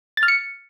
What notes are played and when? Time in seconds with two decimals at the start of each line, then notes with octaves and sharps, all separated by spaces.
0.17 A6
0.23 F6
0.28 C#7